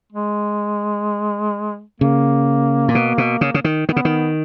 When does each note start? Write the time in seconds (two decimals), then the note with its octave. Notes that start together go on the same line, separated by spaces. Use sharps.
0.12 G#3
2.00 C#3 A#3
2.88 A#2
2.95 B2
3.18 B2
3.41 C#3
3.54 C#3
3.64 D#3
3.89 D#3 B3
3.96 C#3
4.05 D#3